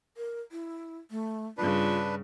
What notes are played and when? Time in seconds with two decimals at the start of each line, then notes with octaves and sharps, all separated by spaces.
0.17 A#4
0.52 E4
1.11 A3
1.58 G2 C#3 D4 F4 B4